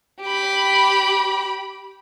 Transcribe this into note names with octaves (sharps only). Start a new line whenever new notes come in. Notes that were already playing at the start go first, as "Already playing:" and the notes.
G4 B5